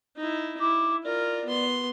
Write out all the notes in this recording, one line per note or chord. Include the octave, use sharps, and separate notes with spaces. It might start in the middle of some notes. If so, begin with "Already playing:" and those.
D#4 E4
E4 D6
F4 A#4 D5
B3 C6